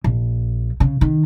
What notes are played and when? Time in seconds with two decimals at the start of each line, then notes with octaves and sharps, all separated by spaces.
0.04 A#1
0.80 C#3
1.01 D#3